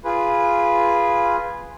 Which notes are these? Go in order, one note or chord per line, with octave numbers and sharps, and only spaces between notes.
F4 G#4 B4